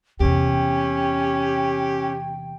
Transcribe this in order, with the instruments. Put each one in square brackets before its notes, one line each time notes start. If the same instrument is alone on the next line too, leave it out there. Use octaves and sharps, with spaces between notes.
[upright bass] E2 C3 [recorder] C#4 [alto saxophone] G4 [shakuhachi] G5